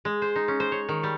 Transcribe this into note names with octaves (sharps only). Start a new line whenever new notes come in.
G#3
C5
D#4
C#4
C5
C#5
D#3
G3